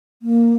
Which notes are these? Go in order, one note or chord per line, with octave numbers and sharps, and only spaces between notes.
A#3